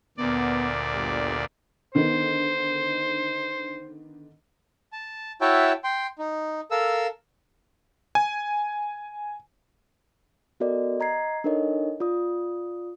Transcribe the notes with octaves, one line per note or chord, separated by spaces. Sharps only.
D2 A#2 B3 D5
G1 G3
D3 D#3 B3 C5
A5
E4 F#4 C#5 E5 G5 A5
G5 C6
D#4
A4 A#4 F5 E6
G#5
B3 F#4 A4 A#4 D5 D#5
D#5 A#5 G#6 C7
D4 D#4 A4 A#4 C#5 D#5
F4 D5 D#6